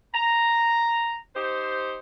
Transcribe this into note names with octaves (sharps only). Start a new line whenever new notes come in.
A#5
D#4 G4 C5